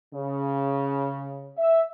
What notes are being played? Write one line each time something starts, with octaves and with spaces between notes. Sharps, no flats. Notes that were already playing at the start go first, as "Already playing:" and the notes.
C#3
E5